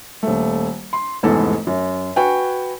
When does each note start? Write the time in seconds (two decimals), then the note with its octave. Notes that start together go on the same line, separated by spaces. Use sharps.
0.23 D#1 A3
0.93 C6
1.23 F1 E2 G#2 A4
1.67 F#2
2.16 F#4 B4 G5 G#5